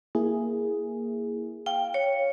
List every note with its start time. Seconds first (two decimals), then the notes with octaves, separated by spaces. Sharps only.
0.15 A#3 E4 G#4
1.66 F5 G5
1.94 C#5